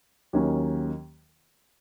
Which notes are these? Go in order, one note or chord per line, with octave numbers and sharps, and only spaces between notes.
D#2 D#3 F#3 A#3 C#4